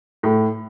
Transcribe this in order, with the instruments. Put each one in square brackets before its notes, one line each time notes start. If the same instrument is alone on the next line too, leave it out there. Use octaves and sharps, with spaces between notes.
[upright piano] A2